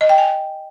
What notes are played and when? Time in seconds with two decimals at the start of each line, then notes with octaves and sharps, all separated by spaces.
0.01 D#5
0.09 G5
0.18 G#5